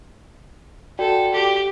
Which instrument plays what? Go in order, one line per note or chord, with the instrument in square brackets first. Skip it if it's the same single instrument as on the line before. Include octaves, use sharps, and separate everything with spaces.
[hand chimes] F#4 D5 G5 [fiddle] A4
[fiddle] G4